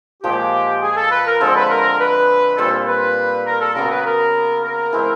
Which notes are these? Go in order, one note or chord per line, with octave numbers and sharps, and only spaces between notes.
A#2 F3 G#3 G4
G#4
A4
B4
A#4
D3 F3 G#3 C4 A4
B4
A#4
B4
A#2 G3 C4 F4 A4
B4
A#4
A4
C#3 F#3 B3 A#4
B4
A#4
A#4
E3 G#3 C4 E4